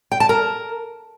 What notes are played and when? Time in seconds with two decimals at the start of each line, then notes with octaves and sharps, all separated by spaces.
0.11 G5
0.20 A5
0.29 A#4